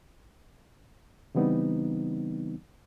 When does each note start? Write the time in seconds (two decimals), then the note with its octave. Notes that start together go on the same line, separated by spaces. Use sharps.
1.35 C#3 E3 G3 B3 C4 D#4